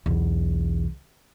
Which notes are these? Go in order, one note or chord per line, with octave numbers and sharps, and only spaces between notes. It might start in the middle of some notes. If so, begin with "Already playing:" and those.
B1 E2